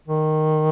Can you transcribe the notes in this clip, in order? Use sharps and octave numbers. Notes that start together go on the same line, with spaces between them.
D#3